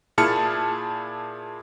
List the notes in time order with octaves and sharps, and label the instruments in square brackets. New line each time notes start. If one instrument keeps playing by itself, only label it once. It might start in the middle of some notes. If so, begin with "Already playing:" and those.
[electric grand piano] A#2 E4 G#4 A5 F6 C#7